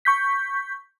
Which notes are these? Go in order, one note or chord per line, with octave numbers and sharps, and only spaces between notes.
C#6 G6 B6